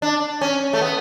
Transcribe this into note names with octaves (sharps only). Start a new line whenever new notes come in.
D4
C#4
A3
B3